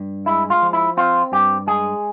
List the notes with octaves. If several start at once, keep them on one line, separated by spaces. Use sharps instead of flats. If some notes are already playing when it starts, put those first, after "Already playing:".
Already playing: G2
G#3 E4
F4
F3
E4
C4 F4
G2 G4
G#3 G#4